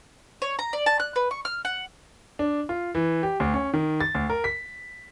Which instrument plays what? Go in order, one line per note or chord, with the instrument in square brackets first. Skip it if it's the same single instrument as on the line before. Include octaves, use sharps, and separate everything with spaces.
[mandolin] C#5
A#5
D5
A5
F#6
B4
C#6
F6
F#5
[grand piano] D4
F4
E3
G4
D2
C#4
D#3
A6
D2
A#4
B6